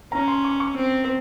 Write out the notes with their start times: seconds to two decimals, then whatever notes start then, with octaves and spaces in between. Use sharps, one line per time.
0.12 C#4 A#5
0.28 C6
0.44 C#6
0.60 C#6
0.76 C4